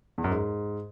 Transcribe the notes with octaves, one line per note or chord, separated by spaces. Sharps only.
E2
F#2
G#2